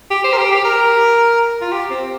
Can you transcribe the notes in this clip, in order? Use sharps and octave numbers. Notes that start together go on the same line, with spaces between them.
G4
C5
A#4
G4
G4
A#4
F4
G4
C4